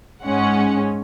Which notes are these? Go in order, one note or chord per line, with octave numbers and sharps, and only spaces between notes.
G#2 G#3 C#4 F#5